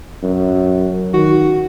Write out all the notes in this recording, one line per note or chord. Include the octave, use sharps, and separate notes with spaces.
F#2
D#3 F#4